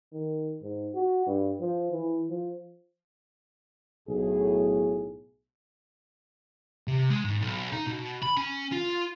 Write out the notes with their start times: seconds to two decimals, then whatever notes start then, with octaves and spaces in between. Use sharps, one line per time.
0.13 D#3
0.62 G#2
0.94 F#4
1.26 G2
1.60 F3
1.92 E3
2.30 F3
4.08 B1 A2 G#4
6.87 C3
7.10 G#3
7.25 G#2
7.42 B1
7.72 D#4
7.87 B2
8.22 B5
8.37 C#4
8.72 F4